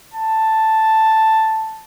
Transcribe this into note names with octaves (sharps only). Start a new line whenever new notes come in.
A5